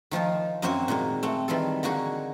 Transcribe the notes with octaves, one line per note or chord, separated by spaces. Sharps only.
D#3 F3 D#4 F4
F#2 A#3 C4 F#4 C5 G#5
A#2 D#3 G#3 A#3
A3 C4 F#5
D#3 E3 G3 F4 G#4 A4
D3 A#3 D#4 F#4 G#4